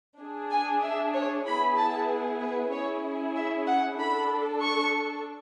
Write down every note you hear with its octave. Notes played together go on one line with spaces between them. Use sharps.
D4 G#4
G#5
E5
C#5
B3 E4 G#4 B5
A5
B4
C#4 E4 G#4 C#5
E5
F#5
D4 A4 B5
C#6